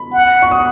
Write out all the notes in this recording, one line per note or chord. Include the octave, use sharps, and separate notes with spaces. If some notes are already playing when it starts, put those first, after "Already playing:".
Already playing: B5
F#5
C#6
D#6